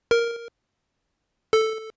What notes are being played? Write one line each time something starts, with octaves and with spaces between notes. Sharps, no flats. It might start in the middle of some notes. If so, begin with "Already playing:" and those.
A#4
A4